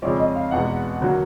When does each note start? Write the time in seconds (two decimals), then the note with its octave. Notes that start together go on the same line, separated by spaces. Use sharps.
0.02 F2 C#3 F3 G#3 C#4 D5
0.19 D#5
0.36 F5
0.51 E2 B2 G#3 F#5
1.01 D3 F#3 A#3